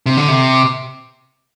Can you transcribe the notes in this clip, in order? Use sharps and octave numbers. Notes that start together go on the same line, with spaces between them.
C3
D3
C3